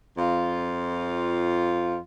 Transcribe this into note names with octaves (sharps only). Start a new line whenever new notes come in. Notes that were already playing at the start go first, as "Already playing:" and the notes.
F2 F4